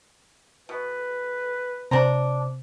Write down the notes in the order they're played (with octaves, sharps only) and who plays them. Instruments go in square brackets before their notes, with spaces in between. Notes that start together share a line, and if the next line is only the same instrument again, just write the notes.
[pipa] B2 [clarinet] B4
[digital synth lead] C3 [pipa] D4 C5 A#5